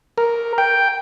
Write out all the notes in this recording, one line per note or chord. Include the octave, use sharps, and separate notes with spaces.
A#4
G5